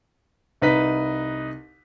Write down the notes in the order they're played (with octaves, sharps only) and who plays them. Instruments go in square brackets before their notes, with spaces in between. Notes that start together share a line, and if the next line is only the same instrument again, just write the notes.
[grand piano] C2 D#4 B4 B6